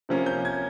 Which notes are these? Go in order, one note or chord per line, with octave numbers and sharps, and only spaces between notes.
C3 F3 A#3 C#4
G6
G#6